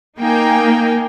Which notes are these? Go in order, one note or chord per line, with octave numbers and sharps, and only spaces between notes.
A#3 D#4 G5 G#5